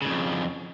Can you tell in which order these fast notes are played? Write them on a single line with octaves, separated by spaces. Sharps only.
C#3 G#2 F2